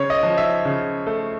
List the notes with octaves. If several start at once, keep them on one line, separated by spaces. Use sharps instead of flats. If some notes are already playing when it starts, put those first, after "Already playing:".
Already playing: C#3 C#5
D#5
F3
E5
C#3
A3